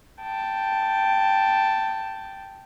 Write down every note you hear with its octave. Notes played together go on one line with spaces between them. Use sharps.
G5 A5